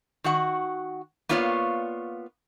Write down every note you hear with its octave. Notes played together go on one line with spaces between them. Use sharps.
D#3 F#4 F#5
A#3 B3 F4 C#5 D5 F5